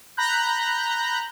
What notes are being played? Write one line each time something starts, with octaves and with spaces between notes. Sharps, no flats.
A#5 B5 F#6 G6